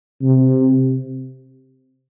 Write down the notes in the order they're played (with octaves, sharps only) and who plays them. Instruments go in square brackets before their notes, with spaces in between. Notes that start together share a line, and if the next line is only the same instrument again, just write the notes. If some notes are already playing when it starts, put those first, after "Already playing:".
[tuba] C3